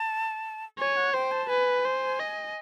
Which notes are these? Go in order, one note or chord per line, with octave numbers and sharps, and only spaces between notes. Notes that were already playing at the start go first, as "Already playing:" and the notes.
Already playing: A5
C#5 G#5
F#5
C5 G5
A5
B4 G#5
C5
D#5